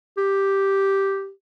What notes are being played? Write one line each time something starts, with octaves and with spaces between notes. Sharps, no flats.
G4